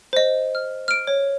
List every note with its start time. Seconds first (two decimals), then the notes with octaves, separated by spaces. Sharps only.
0.13 C5 D#5
0.55 F6
0.88 F6 D7
1.07 C#5